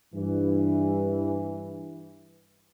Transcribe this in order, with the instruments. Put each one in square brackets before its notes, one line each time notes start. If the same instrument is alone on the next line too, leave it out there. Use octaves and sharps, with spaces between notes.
[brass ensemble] G2 E3